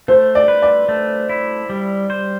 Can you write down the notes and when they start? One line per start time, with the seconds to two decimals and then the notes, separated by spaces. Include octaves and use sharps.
0.08 A3 C5
0.35 D5
0.48 B4
0.62 D5
0.89 A3
1.29 E4
1.69 G3
2.10 C5